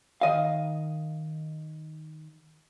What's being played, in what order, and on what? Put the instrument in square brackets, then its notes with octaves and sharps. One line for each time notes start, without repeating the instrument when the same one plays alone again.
[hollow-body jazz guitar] D#3 D#5 F5